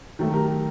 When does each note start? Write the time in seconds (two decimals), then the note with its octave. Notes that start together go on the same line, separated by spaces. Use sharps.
0.19 D#3 F#3 A3
0.33 G4 A#4
0.48 G4